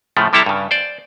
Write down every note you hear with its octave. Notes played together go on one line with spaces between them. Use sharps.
A2 C#3 F3 A3
C3 G3 E4 A4 A5 A#5
G2 C#3
C5 D5